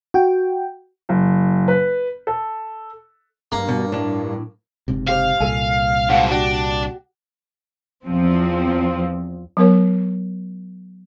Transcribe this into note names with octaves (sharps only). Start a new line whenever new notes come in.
F#4 G5
F#1
B4
A4
G2 A#3
B2
A2 D4
F#1 G#2 C3
G4 C5 F5
C2 A#2 A4 G#5
G#2 B2 F5 F#5
D4 F#4 G4
E2 F3 C4
F#3 B3 A#4 C#5